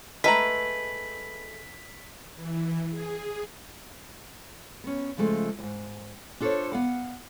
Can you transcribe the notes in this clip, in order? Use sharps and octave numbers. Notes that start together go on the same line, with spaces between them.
G#3 A3 B4 A#5 B6 F#7
E3
G#4
B3 C#4
C#3 F3 G#3 A3 F4
D#2 G#2
D4 F4 A4 A#4 C5 C#5
B3 F5 F#5